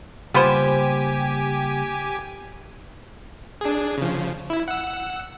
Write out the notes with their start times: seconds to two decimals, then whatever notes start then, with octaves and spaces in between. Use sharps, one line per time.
0.34 C#3 G3 A#3 B3 F4 G4 C5 G#5
3.61 D4 G#4
3.98 C#3 F3
4.50 E4
4.68 F#5 E6